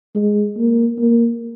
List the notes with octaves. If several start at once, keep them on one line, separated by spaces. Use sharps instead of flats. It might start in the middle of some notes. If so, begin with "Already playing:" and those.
G#3
A#3
A#3